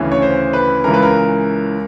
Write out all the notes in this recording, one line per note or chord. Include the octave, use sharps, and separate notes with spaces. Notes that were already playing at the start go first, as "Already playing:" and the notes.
Already playing: D2 C#3 E3
C#5
C5
B4
C#2 C#3 E3 A#4
B4
A#4